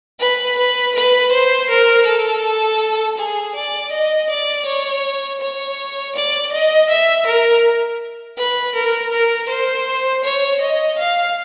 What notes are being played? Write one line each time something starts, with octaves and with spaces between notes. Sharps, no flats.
B4
B4
B4
C5
A#4
A4
G#4
D5
D#5
D5
C#5
C#5
D5
D#5
E5
A#4
B4
A#4
A#4
C5
C#5
D#5
F5